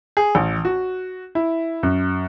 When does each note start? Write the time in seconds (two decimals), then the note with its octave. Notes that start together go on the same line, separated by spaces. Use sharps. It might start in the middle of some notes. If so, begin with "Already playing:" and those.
0.17 G#4
0.35 A1
0.65 F#4
1.35 E4
1.83 F#2